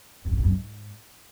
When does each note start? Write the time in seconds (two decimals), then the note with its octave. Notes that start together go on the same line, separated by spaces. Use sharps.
0.25 G2
0.31 G#2
0.37 A#2
0.43 F#2
0.50 G#2